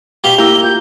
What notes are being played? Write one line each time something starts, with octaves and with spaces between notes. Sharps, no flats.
B2 G4 F5 G7
A#3 E4 G4 A#5 E6
F4 G6